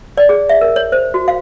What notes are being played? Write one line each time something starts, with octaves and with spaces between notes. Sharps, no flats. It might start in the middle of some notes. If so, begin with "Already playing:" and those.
D5
G#4
E5
A#4
C#5
C5
F#4
F5